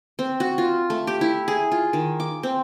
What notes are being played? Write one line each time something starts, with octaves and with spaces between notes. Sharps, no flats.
C4
F#4
F4
A3
G4
E4
G#4
F4
D#3
D6
C4